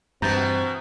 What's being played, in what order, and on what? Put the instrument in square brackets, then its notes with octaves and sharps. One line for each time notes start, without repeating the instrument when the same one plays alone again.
[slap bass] G2 [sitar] B2 E3 [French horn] C4 [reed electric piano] A#5 G6 A6